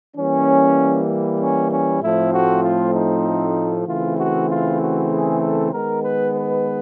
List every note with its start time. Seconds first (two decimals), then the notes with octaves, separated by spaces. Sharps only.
0.17 E3 G3 A#3 C#4
1.40 C#4
1.72 C#4
2.02 A2 F3 A3 C4 E4
2.32 F#4
2.63 F4
2.94 D#4
3.87 C#3 E3 A3 C4 F4
4.18 F#4
4.49 F4
4.80 F#4
5.11 G#4
5.41 A4
5.72 D#3 G#3 B3 A#4
6.02 B4
6.33 B4